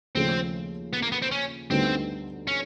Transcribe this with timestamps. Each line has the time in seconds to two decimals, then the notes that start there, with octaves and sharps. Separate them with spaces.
0.15 D#2 C#3 F3 A3 C4
0.93 B3
1.02 A#3
1.12 B3
1.22 C4
1.32 C#4
1.70 D2 D3 G3 B3 C4 D#4
2.47 C#4